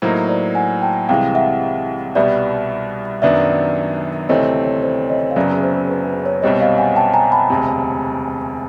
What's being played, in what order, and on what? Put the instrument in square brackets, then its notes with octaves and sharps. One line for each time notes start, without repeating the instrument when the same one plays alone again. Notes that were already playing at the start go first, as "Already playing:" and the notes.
[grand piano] A2 F#3 A#3 D#4 [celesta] C5
[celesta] C5 D5
F#5 G#5
G5 A5
[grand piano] C2 C3 E3 G#3 [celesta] F5 G5
[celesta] E5 F#5
[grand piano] C2 B2 G3 B3 [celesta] D5 E5
[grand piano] F#2 D#3 F#3 B3 D4 [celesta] D5 E5
[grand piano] D2 C3 E3 A3 C4 [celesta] C#5 D#5
[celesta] C#5
C5 D5
C#5 D#5
F5
[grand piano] F#1 F#2 C#3 F#3 B3 [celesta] D5 E5
[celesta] C5
B4
B4
C#5
[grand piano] C2 B2 G3 C4 [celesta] C#5 D#5
[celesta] D#5 F5
F#5 G#5
G5 A5
G#5 A#5
A5 B5
[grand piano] E1 D2 C3